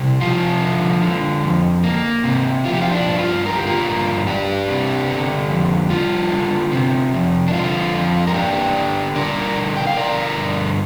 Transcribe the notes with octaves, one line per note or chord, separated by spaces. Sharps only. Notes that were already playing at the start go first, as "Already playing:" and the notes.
Already playing: C3 G3
F3 F4
D3
D3
F2
A#3
C3
F3 F4
G4
F4
D4
G2
F4
D3 A#4
G4
F4 A#4
G2
G3 D4 G4
C3
D3
F2
G3 F4
D3
C3
F2
D4
D3 F4
F2
A#4
A#3 D4 G4
D3
G3 A#4 D5
D3
G5
F5
D3 A#4 D5
G2